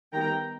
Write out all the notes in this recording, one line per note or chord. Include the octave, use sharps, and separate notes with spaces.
D#3 G3 B3 G5 A#5